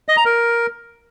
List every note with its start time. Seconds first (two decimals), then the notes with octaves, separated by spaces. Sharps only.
0.09 D#5
0.17 A#5
0.25 A#4